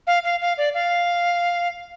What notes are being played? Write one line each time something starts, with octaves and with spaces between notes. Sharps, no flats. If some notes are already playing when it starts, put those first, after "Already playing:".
F5
F5
F5
D5
F5